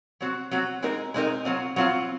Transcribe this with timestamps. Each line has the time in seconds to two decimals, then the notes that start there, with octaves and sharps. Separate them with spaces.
0.20 F#3 C4 F#4
0.51 F#3 C4 F#4
0.82 G#3 C4 D#4 A#4
1.14 G#3 C4 D#4 A#4
1.45 F#3 C4 F4
1.76 F#3 C4 F4